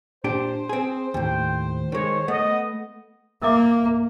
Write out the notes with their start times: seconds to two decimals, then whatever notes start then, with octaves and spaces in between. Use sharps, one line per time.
0.24 A#2 D4 G4 C5
0.69 C4 G#4
1.14 D#2 A2 G5
1.92 D#3 G#3 C#5
2.28 A3 B3 D#5 F#5
3.42 A#3 A#4 E5 D6